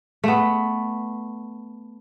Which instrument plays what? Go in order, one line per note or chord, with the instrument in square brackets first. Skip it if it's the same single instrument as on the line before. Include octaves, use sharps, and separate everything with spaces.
[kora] A3 B3